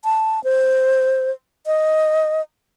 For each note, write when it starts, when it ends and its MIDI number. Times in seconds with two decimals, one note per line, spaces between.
0.04 0.43 81
0.44 1.31 72
1.66 2.41 75